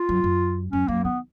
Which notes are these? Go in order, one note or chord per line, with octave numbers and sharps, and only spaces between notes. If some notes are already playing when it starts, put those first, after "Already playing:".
Already playing: F4
F#2
F#2
F#2 C#4
F#2 A#3
D#3 B3